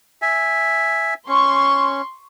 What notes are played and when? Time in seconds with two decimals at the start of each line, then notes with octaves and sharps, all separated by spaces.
0.22 E5 G#5
1.28 C#4 C6 C#6